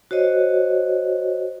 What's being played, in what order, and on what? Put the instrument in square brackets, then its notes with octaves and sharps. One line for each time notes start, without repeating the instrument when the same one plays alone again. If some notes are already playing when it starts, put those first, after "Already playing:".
[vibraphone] F#4 C5 C#5 D#5